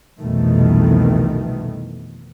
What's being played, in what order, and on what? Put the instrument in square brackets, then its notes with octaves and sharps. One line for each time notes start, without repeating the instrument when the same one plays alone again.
[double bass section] C2 F2 B2 D#3 E3 A3